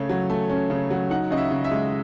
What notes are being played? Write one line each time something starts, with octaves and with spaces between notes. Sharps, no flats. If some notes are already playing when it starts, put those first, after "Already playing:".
Already playing: C#3 A3 C#4
F#3
A3
C#4
C#3
F#3
D#4 F#5
C#3 D#5
E5
C#3
E5
G#3